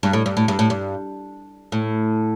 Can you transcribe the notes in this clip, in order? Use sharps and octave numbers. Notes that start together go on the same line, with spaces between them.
G2
A2
G2
A2
G2
A2
G2
A2